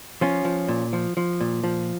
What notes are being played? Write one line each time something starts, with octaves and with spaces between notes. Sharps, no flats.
F3 C#4 F4
F3
A#2
F3
F3
A#2
F3